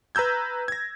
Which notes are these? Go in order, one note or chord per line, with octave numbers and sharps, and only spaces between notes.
B4 A#5 E6 G6 G#6
G#6 A#6